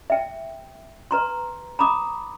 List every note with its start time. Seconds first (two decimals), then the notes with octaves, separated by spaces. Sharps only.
0.10 E5 G5
1.11 B4 A#5 C6
1.79 A#5 B5 D6 D#6